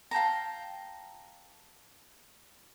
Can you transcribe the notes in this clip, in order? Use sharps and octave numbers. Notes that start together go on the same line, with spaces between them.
F5 G5 A5 A#5